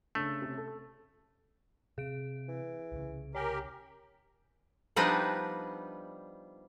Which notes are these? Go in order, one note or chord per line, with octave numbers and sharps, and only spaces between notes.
C#3 A3 D4
C3 C#4
A4
C3 C4 G#4 D7
E3
C2 C#3
G4 A#4 C#5 G#5
F3 G3 B3 D4 D#4